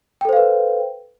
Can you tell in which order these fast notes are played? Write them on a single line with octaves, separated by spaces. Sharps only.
G5 A4 C5 F5 B4